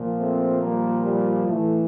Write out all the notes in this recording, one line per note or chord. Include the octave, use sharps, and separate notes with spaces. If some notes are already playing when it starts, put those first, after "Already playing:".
Already playing: A#2 F3
A3 C4
G3 A#3
G3
A2 E3 A3